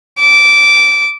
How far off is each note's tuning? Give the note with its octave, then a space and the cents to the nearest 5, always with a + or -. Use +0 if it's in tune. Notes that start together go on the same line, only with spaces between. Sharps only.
D6 -15